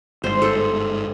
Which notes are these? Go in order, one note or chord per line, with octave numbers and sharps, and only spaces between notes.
G1 G#2 C5
A4 C5